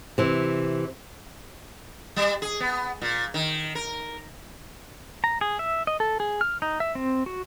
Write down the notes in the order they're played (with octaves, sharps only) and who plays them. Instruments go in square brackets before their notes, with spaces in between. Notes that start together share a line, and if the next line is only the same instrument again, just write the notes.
[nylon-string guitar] C3 E3
[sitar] G3
G#4
B3
A#2
D#3
A#4
[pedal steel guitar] A#5
G#4
E5
D#5
A4
G#4
F6
D#4
E5
C4
F#4